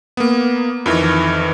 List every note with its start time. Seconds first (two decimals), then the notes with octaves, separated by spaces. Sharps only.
0.17 A#3 B3
0.86 F2 D#3 E3